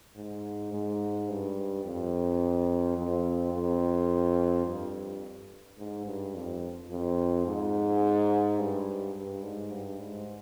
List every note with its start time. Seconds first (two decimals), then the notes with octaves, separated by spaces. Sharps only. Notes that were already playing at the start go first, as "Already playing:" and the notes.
0.16 G#2
0.73 G#2
1.29 G2
1.85 F2
2.98 F2
3.53 F2
4.66 G2
5.78 G#2
6.06 G2
6.35 F2
6.90 F2
7.47 G#2
8.59 G2
9.16 G2
9.43 G#2
9.71 G2
10.00 G#2